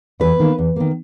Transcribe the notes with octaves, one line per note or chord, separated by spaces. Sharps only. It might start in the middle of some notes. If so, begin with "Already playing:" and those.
E2 B4
D#3 A#3
E2
D#3 A#3